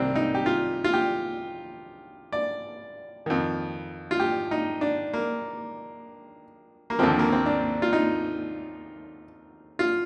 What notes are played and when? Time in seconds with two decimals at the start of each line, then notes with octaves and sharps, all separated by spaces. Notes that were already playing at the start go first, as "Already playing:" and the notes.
Already playing: C2 C3 D#3 A#3 C4 D4
0.15 D#4
0.35 G4
0.46 F4
0.84 F4
0.94 G4
2.32 D5
3.26 F2 D#3
4.11 F4
4.20 G4
4.51 D#4
4.81 D4
5.13 A#3
6.90 A#3
6.99 D#2 D3 F3 C4
7.19 A#3
7.32 C4
7.46 D4
7.82 F4
7.93 D#4
9.79 F4